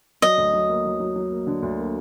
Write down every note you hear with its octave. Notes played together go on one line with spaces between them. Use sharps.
F#3 D#5
D2
F#3
A#3
F#3
F#3
F#3
A#3
D3
D2
A#3